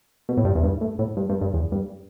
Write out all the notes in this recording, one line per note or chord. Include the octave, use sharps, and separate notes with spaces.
B2
A2
G2
E2
G2
A2
A2
G2
G2
G2
E2
G2